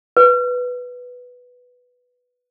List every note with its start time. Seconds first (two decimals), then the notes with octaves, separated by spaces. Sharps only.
0.17 B4